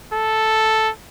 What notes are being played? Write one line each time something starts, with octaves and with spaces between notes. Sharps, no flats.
A4